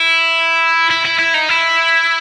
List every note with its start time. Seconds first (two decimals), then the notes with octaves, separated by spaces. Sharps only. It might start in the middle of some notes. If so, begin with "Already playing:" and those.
Already playing: E4
0.90 E4
1.05 E4
1.19 E4
1.34 D#4
1.49 E4